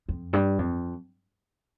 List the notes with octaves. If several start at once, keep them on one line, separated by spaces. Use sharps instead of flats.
F2
G2
F2